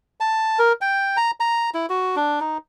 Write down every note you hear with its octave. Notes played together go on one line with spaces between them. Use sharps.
A5
A#4
G5
A#5
A#5
E4
F#4
D4
D#4